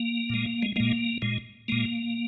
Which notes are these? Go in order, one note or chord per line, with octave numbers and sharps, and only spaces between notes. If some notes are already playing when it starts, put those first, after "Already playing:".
Already playing: A#3
A#2 G#3
G#3
A#2 G#3 A#3
A#2 G#3
A#2 G#3 A#3